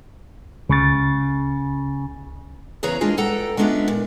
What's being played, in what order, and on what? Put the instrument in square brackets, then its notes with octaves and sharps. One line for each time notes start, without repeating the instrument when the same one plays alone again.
[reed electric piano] C#2 A6 [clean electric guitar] C#3
[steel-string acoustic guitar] E2 C#3 G#4 B4 C#5 A#5
E3 G#3 A#3 D4 F4 G#4
G2 A4 F#5 G5 A#5
G#3 B3 C#4 D4 F4 E5
A#2